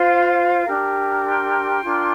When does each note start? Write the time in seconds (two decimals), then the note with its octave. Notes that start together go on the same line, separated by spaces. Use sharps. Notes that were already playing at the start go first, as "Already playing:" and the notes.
Already playing: F4 C5 F5
0.66 D4 G4 A#4
1.25 G5 C6
1.83 D4 F4 A#4